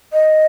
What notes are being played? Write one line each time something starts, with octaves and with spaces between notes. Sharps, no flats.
D#5